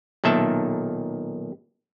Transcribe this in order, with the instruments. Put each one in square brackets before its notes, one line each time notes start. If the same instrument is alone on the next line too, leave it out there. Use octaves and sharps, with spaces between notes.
[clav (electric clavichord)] B1 A#2 D#3 E5 A5